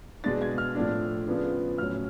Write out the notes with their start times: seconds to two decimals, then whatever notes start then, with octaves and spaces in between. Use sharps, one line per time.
0.24 B2 G#3 D4 A6
0.42 G#6
0.58 F6
0.75 A2 F3 A3 D4
1.26 C#3 F3 B3 D4
1.78 A2 F#3 C#4 F6